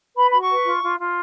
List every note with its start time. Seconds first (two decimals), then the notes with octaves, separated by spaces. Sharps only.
0.16 B4 B5
0.30 F#4 B5
0.41 C#6
0.50 B4
0.66 F4
0.83 F4
1.00 F4